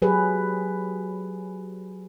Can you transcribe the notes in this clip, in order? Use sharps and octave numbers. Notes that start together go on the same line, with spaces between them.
F#3 G4 G#4 B4